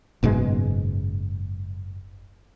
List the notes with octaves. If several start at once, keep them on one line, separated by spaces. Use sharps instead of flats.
F#1 G#2 B2 G#3